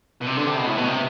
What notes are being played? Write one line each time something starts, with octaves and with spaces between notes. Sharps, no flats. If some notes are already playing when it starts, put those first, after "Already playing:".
B2
C3
D3
C3
B2
A2
B2
C3